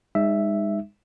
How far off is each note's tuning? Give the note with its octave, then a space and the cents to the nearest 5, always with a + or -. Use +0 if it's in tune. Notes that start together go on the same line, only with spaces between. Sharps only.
G#3 -35 D#4 -15 E5 +0